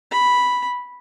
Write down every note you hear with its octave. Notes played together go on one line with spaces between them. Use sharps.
B5